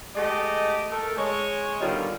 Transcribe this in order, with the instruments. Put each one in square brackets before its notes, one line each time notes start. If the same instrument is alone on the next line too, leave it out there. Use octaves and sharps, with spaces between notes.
[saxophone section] G#3 A3 G4 D#5
A3 A4 A#4
G#3 C#5 D#5
G2 B2 D3 D#3 G3 F4